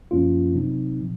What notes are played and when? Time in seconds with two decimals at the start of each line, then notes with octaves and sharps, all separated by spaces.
0.11 F#2 F3 A#3 C#4 F4
0.55 C3 F#3 C4 D#4
1.00 A#2 F3